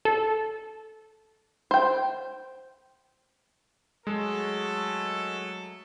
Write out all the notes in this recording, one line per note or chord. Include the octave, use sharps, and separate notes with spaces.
A4
C5 G5
F#3 G#3 A3 A4